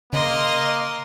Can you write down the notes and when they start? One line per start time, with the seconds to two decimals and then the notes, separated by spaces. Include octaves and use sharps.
0.13 C#3 A#3 D#5 C6